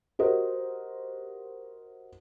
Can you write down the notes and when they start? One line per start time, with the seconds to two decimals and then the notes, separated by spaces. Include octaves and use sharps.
0.19 F#4 G4 A#4 C5 D#5